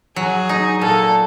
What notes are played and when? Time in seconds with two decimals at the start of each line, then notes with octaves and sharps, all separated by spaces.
0.16 F#3 G#4
0.49 D#4
0.81 A#2 A4